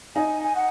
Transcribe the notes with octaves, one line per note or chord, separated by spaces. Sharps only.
D#4 G#5
G#5
F#5